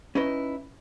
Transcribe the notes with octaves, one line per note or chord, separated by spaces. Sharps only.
C#4 D#4 E4 B4 D#5